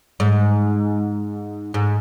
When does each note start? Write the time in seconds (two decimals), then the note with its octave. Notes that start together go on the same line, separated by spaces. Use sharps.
0.20 G#2
1.74 G#2